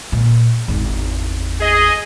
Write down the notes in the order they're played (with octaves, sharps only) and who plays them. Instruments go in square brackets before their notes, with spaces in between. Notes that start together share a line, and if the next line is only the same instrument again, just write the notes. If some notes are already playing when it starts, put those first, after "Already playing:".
[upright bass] A#2
G#1 E2
[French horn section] G#4 D#5